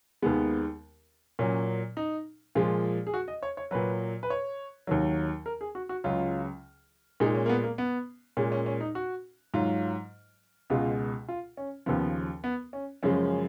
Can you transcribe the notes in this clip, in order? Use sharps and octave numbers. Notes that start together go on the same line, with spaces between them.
D#2 D#3 G#3 B3
A#2 F#3 C#4
D#4
A#2 F3 G#3 F4
G#4
F#4
D#5
C#5
C#5
A#2 F#3 B4
B4
C#5
D#2 D#3 F#3
A#4
G#4
F#4
F#4
C#2 C#3 F#3 F4
A#2 G#3 D#4
C#4
A#3
B3
A#3
B3
A#2 G#3 C#4
C#4
C#4
D#4
F#4
G#2 F#3 F4
C#2 B2 G#3 F4
F4
C#4
D#2 C#3 F3 B3
B3
C#4
F#2 C#3 F3 G#3 C#4